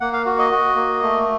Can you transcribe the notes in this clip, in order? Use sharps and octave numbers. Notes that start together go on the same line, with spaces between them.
A#3 F#5
F5
F#4
D#5
F#4
A#3
A3